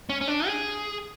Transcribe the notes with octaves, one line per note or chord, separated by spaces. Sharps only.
C#4
C#4
D4
G#4